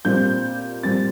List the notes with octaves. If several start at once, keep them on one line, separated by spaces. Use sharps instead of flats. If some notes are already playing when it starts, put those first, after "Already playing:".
A#2 G3 C4 G6
A#2 G3 C4 A6